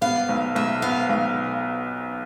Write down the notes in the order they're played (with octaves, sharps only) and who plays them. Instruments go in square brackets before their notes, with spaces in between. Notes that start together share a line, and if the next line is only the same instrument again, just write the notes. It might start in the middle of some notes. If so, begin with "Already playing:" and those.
[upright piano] B3 [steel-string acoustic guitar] F5
[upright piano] B1
[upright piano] B1 [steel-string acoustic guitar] E5
[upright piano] B3 [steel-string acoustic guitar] F5
[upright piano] B1